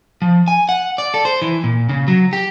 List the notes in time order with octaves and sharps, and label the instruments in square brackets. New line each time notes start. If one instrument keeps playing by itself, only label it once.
[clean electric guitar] F3
G#5
F#5
D5
A4
C5
E3
A#2
C#3
F#3
G4